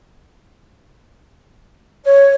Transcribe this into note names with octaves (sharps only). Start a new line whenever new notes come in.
C#5